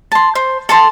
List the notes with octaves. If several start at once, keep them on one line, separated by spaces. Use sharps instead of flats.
A5 C6
C5
A4 A5 C6